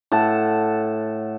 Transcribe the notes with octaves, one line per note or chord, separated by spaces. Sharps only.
A2 F#5 A5